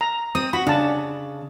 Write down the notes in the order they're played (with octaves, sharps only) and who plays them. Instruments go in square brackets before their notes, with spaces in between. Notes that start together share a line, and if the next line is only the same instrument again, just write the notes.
[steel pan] A#5
[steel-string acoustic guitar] C4 [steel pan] D#6
[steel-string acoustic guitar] F#4 [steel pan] B5
[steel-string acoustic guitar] C#3 [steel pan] D4 A5